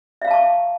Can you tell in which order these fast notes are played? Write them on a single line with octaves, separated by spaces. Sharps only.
E5 F5 A#5 A5 C#6